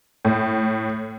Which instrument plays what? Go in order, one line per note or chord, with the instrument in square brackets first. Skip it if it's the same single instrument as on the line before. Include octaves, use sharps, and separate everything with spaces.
[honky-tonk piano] A2